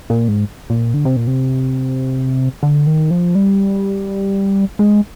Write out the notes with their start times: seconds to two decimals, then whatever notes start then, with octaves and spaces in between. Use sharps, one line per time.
0.10 A#2
0.28 G#2
0.70 A#2
0.94 D3
1.05 C3
1.16 A#2
1.27 C3
2.63 D3
2.87 D#3
3.11 F3
3.35 G3
4.79 G#3